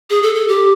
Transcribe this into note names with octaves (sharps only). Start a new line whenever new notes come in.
G#4
A4
A4
G4